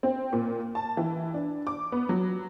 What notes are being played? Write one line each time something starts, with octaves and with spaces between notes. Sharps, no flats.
C4
A#2
A5
E3
D4
D6
B3
F#3